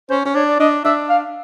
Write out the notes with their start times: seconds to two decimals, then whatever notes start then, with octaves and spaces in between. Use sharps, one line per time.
0.10 C#4 C5
0.25 C#4
0.35 D4 C#5
0.48 D5
0.60 D4 D#5
0.84 D4 E5
1.09 F5